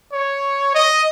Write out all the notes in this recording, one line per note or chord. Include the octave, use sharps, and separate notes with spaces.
C#5
D#5